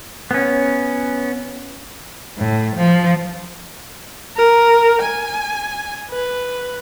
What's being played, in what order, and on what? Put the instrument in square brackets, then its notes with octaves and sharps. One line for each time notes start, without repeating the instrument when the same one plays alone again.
[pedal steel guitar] B3 C#4
[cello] A2
F3
[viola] A#4
G#5
B4